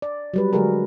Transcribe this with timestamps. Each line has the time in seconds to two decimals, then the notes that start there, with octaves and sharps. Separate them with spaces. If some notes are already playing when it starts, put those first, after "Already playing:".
0.02 D5
0.34 F#3 G3 B4
0.53 D3 F#3 G#3 F#4 G#4 A#4